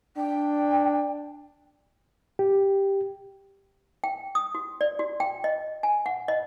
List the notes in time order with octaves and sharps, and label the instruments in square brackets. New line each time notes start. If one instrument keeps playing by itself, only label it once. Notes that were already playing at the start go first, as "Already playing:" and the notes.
[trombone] D4 [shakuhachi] G5
[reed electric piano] G4
[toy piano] G5
D#6
F#4
D5
F#4
G5
D#5
G#5
F#5
D#5